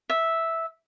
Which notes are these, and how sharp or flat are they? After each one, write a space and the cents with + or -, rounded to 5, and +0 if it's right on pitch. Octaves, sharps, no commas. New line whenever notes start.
E5 -5